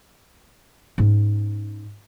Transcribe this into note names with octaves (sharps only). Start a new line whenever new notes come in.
G#2 C#4